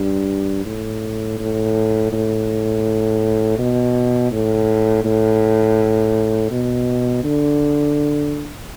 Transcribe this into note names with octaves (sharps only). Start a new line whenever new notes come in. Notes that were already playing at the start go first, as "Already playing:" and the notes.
Already playing: G2
A2
A2
A2
B2
A2
A2
B2
D3